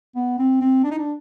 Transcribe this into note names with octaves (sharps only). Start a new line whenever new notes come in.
B3
C4
C4
D4
D#4
D4